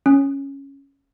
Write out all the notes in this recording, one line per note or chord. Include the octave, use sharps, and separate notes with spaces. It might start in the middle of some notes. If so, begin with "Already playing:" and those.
C#4